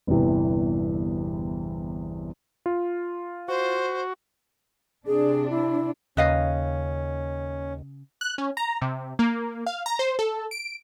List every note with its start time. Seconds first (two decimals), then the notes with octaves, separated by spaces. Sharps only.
0.07 G1 E2 C3 E3
2.66 F4
3.48 F#4 C5
5.07 C3 D4 G#4
5.50 E4
6.17 D#2 C#3 C#4 B4 D#5 F5
8.21 F#6
8.38 C#4
8.57 A#5
8.81 C3
9.19 A#3
9.66 F5
9.86 A#5
9.99 C5
10.19 A4
10.51 D7